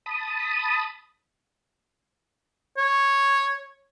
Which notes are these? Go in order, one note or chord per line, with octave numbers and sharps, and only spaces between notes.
A5 B5 D#6
C#5